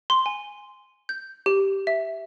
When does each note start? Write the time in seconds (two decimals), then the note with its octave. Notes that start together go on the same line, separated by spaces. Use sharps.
0.10 C6
0.26 G#5
1.09 G6
1.46 G4
1.87 E5